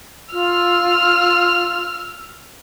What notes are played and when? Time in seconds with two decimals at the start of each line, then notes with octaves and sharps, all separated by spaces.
0.33 F4 E6 F6